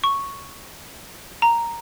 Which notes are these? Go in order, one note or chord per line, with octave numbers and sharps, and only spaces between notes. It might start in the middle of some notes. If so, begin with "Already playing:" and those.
C#6
A#5